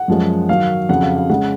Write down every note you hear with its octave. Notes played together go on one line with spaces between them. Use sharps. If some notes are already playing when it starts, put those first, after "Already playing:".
Already playing: F#5
F#2 F3 G#3
G#2 D#3 F#3 F5
F2 C#3 F#3 F#5
F5
F5
C#3 G#3 F#5